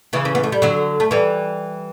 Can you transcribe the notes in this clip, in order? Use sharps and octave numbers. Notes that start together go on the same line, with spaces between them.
C#3 E3
C#4
B3
A3
G3
D3 F#3
A3
E3 G3